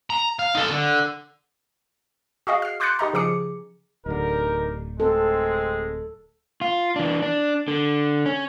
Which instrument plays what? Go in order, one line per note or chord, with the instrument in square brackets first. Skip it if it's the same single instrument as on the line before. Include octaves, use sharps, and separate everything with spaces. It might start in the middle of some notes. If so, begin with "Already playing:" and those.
[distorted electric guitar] A#5
F5
D#4 A4
D3
[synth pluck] F#4 G#4 D#5 F5
F6 C7
C6 D6 F#6 G6 A6 C#7
D#4 G4 D#5 A#5
C#3 F3 G#4 D6 C#7
[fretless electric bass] D1 D3 [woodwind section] D#4 G4 [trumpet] A#4
[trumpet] G#3 [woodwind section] C4 [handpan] A4
[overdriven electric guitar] F4
E3 D4
D4
D3
C#4